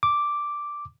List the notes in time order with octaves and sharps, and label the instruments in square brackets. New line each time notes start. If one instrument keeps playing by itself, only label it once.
[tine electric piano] D6